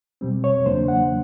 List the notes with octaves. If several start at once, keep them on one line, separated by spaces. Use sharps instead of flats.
B2 G3 C4
C#5
E2 C#3 F#3 A#3 D4 C5
F#5